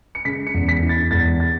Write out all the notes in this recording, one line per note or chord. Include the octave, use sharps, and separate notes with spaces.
C#7
C#3 B6
C#7
E2
B6
E4
A6
E2 A6
A6